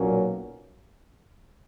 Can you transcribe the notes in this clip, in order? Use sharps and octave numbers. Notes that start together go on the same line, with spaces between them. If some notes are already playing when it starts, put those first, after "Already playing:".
Already playing: B1 A#2 F#3 A#3 C#4